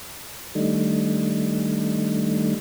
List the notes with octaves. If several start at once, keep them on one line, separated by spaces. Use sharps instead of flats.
D#3 G3 A3 D4 D#4